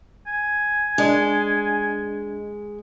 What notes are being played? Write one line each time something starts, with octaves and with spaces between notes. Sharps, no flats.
G#5
G#3 D4 D#5